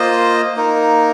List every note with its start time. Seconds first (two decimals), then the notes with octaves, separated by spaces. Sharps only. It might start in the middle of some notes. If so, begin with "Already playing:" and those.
Already playing: A#3 F4 C5 D#5
0.56 A#3 D#4 A#4